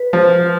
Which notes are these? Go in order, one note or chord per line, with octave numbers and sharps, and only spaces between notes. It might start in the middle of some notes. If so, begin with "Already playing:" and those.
Already playing: B4
F3